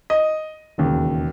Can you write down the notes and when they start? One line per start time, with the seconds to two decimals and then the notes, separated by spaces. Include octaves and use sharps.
0.10 D#5
0.78 E1 D#2 C#3